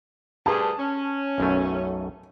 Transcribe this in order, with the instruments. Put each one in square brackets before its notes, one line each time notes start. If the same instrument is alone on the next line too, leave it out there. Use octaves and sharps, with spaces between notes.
[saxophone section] D2 G2 G#4 [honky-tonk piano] A5
[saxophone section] C#4
[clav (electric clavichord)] B1 F#2 A3